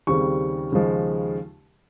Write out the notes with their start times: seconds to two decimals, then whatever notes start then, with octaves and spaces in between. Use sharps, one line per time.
0.07 D#2 C#3 G3 C4 C#6
0.72 D#2 C#3 F3 G#3